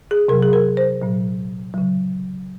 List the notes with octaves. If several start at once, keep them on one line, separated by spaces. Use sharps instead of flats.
G#4
C3 F#3 A#4
G#4
A#4
C5
A#2 F#3
C#3 F#3